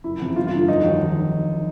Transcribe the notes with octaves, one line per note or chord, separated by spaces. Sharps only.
F#1 E4
E2 C3 F3
G1 F4
F4
G2 D3
F1 D#4
D#2 D#3 F#3